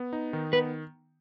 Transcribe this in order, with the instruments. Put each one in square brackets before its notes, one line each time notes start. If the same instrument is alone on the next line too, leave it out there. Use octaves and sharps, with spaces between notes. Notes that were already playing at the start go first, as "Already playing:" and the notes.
Already playing: [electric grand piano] B3
D#4
D#3
[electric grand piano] B3 [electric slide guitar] B4